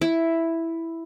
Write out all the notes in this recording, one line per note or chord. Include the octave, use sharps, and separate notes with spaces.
E4